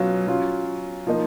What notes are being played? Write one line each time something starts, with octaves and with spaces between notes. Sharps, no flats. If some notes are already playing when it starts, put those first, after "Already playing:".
Already playing: B2 F#3 C#4 F4
F#3 C#4 F4
F3 A#3 D#4